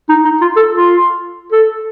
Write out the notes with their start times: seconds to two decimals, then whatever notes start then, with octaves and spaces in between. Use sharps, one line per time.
0.09 D#4
0.25 D#4
0.42 F4
0.56 A4
0.73 F4
1.52 A4